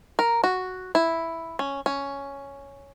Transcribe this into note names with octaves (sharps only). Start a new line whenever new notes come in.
A#4
F#4
E4
C#4
C#4